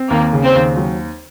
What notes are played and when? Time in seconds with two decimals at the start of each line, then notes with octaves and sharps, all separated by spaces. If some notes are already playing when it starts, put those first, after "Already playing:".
Already playing: C4
0.10 D#2 A#3
0.33 C#3
0.44 C4
0.55 D#2
0.77 F#3